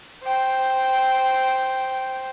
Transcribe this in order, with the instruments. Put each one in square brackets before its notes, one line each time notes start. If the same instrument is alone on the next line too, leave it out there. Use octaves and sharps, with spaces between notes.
[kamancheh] C5 G5